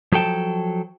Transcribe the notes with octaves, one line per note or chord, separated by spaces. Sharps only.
F3 F#3 A4 G5 A5